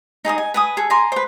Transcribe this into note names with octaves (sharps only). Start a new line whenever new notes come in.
D#4 G#4 D#5 D#6
G#5
B4 G#5 D#6
G#4 A4
G#5 A#5 C6 D6
B4 C5